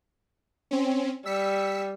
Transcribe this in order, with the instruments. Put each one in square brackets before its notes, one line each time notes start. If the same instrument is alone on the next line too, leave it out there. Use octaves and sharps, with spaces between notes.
[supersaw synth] C4 C#4
[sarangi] G3 [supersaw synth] E6 B6 C#7